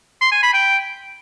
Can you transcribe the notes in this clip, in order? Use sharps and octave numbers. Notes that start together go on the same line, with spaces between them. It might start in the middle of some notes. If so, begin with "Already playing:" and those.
C6
G#5
B5
G5